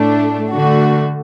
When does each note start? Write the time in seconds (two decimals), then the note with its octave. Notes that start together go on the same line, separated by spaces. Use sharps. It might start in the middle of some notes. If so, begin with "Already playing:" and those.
Already playing: A2 A3 D4
0.51 D3 A3 F#4